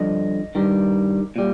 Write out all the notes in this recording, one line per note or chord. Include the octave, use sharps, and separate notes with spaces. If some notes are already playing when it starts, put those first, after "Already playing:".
Already playing: G2 D3 F3 D#5
G2 D#3 G3
A#2 G3